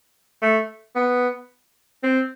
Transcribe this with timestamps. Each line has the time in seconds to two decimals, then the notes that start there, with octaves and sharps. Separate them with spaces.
0.42 A3
0.96 B3
2.03 C4